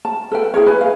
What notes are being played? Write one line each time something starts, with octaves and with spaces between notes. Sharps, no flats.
A5
A4 B4 G5
E4 G#4 A#4 C#5
B4 G#5
F5